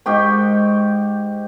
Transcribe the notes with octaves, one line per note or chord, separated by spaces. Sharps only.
G#2 G4 G5 C#6